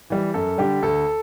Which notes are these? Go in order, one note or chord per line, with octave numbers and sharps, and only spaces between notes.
E3 G3
F#2 A4
D3 G3 G4
D2 A4